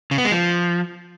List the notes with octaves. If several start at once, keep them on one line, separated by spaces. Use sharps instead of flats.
C#3
B3
G#3
F3